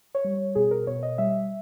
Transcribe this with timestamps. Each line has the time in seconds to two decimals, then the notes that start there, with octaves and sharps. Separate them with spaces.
0.15 C#5
0.24 G3
0.55 B2 G#4
0.71 A#4
0.87 B2 C#5
1.03 D#5
1.18 G3 E5